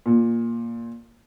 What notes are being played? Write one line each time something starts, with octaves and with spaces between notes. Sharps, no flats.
A#2